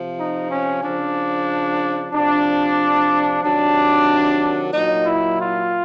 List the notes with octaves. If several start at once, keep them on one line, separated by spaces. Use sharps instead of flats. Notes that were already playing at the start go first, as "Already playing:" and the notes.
Already playing: C3 F3
D#4
C#4
C#3 F3 D4
C3 F3 D4
C3 D#3 F#3 D4
A#2 F#3 D#4
E4
F4